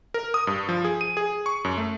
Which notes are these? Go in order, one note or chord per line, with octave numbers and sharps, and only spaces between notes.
A#4
D#6
G2
F3
G#4
D#7
G#4
C#6
F#2
A3